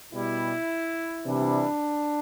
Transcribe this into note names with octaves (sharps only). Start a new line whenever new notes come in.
B2 G3 E4
C3 E3 G3 D4